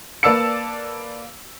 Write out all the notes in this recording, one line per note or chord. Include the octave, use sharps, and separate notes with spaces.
A#3 B4 D5 A5 E6 C#7